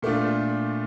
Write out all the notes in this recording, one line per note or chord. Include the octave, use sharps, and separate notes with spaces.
A#2 A3 D4 F4